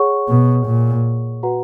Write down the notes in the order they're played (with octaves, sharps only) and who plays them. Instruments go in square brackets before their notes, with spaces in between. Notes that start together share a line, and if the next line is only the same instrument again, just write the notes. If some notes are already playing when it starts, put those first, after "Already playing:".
Already playing: [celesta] G#4 C#5 F#5 C#6
[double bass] B2
A#2
[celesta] F#4 B4 F#5 A#5